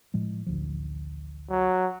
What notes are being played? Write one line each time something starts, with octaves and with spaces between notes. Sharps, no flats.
A2 F3 G#3
A1 D2 F3
F#3